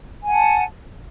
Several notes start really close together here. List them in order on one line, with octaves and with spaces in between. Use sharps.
G#5 F#5 A5